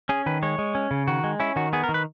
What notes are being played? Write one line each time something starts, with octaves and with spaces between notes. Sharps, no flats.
C#4 G#4
D#3 B4
G#3 C#5
G#3
C#4
C#3
D#3 F#4
G#3
C#4 E4
D#3 F#4
B3 G#4
A#4
D#3
B4